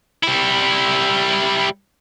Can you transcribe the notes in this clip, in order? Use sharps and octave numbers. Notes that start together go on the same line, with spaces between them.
G3 E4